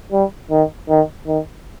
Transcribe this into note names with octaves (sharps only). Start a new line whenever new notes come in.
G3
D#3
D#3
D#3